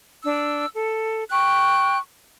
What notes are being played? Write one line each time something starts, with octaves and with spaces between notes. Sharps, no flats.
D4 E6
A4
G5 C#6 F#6